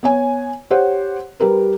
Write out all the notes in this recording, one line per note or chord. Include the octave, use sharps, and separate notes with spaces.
B3 C#5 G#5
G4 C5 C#5 F#5
G3 G4 A#4 B4